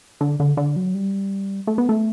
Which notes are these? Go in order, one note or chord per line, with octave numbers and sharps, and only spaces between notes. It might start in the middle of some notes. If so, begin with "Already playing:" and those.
D3
D3
D3
F#3
G3
A3
B3
A3